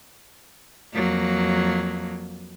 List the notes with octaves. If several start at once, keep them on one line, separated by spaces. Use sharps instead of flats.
F2 F#3 A#3